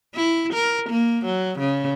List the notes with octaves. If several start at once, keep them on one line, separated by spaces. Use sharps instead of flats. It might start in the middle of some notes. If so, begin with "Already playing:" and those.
E4
A#4
A#3
F#3
C#3